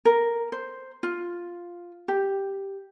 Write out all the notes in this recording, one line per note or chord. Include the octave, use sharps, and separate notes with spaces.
A#4
C5
F4
G4